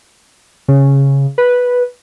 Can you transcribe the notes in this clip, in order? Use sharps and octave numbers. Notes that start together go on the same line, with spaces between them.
C#3
B4